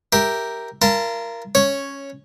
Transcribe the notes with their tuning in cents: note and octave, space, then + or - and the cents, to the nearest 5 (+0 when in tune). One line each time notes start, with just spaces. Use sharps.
G4 +0 A#4 +0 E5 +0
F4 -35 A#4 +0 A5 +5
C#4 -5 C#5 +0